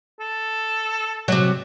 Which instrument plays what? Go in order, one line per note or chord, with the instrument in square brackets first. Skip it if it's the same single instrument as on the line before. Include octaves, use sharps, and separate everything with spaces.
[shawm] A4
[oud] C3 F#3